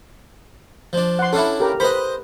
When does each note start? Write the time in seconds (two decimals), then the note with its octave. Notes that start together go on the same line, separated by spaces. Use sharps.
0.93 F3 D4
1.19 F#5 C6
1.33 C#4 D4 E4 A4
1.60 G4 A#4
1.80 B4 C5 D#5 B5